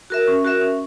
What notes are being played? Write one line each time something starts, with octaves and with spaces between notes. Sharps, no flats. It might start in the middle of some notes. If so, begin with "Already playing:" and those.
F#4 A#4 E5
C#4
F#4 A#4 E5
C#4